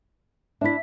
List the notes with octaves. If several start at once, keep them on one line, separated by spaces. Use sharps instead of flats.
D4 E4 E5 B6